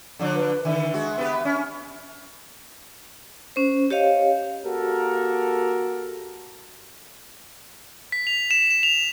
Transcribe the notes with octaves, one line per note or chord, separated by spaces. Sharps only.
D3 F3 D4
B4
D3 D#3 E5
G#3 F#4
B3 G4 B4
C#4
C#4 C5
G4 C#5 D#5 F5
A#3 F#4 G4 A4 A#4
B6
F7
E7
E7
F7